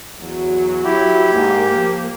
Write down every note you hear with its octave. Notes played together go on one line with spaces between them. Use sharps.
E2 F#3
E4 G4
G#2 A#3
F3